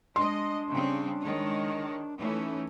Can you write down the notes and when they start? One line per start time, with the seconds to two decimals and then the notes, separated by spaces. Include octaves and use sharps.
0.16 G#3 D4 D#5 C6
0.71 C#3 G3 C4
1.22 D#3 G#3 C#5
2.19 E3 A3 C#4 D#4